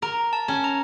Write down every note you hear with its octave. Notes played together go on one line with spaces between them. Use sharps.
A#4 A#5
A5
C#4
A#5